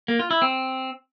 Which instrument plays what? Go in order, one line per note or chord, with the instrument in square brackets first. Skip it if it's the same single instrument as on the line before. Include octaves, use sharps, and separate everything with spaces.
[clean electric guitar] A#3
F4
E4
C4